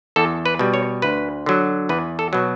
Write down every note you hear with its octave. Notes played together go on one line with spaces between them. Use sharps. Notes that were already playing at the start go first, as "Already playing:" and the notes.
E2 A4
B4
B2 G3
C#5
D2 B4
D3 F#3
E2 B4
A4
B2 F#3